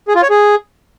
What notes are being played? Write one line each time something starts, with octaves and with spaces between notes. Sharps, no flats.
G#4
F4
C#5
G#4